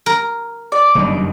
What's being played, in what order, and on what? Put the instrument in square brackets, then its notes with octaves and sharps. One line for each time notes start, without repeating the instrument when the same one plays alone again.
[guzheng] A#4
[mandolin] D5
[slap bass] F#1 G2 D#3